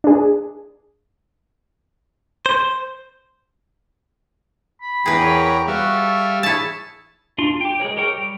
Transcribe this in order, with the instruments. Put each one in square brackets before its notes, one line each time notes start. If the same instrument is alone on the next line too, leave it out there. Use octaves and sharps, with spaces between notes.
[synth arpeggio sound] D4 G#4
[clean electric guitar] C5
[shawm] B5
[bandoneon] E2 E3 G5 [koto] G#4 B4 [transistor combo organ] A#5
[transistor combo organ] A#4 C#5
[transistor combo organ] G3 E5 F5 [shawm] F#4 [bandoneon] C#6
[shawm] A4
[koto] E4 A5 [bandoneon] G#4 G#5 [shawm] C#5
[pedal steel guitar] D4 F4 C6
G4 G5
G#3 G#4 A#4 C#5
G4 A#4 C#5 G5
G3